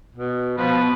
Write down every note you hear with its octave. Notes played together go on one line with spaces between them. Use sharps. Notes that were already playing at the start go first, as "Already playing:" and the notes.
B2
B2 F3 B4